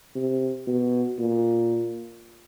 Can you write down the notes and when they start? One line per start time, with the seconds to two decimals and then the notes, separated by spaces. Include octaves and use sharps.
0.15 C3
0.67 B2
1.18 A#2